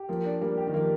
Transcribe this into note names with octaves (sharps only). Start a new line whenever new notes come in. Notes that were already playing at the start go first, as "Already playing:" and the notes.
Already playing: G4
F3 A#3
D4
G3 A#3
G4
D#3
F3 A#3